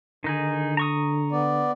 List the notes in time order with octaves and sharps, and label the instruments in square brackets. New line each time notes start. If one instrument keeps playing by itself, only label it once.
[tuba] D3 [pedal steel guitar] D#3 D#4 G#4
[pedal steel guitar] A#5 C#6 D#6
[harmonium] B3 D5